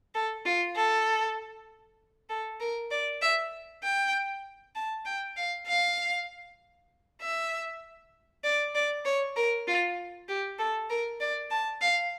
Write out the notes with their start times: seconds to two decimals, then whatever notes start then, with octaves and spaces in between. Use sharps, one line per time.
0.15 A4
0.45 F4
0.75 A4
2.29 A4
2.60 A#4
2.91 D5
3.22 E5
3.83 G5
4.75 A5
5.05 G5
5.37 F5
5.67 F5
7.21 E5
8.44 D5
8.75 D5
9.05 C#5
9.36 A#4
9.67 F4
10.28 G4
10.59 A4
10.90 A#4
11.20 D5
11.50 A5
11.81 F5